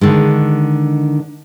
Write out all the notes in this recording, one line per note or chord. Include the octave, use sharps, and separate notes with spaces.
D3 D#3 G#3